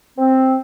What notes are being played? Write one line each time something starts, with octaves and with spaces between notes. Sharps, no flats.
C4